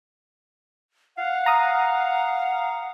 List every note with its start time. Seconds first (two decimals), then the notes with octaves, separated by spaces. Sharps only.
1.17 F5 F#5
1.46 A#5 D#6